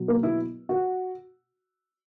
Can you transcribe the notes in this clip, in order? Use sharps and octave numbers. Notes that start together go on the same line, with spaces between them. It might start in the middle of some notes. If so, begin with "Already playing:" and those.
Already playing: B2 F#3
A#3
E4
F#4